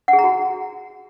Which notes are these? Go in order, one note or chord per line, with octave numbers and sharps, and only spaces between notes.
F#5
G#4
A#5
F#4